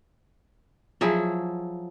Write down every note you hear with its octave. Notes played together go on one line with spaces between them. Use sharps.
F3 F#3 E4 G#4